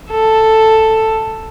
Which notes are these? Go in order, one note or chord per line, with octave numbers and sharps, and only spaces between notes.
A4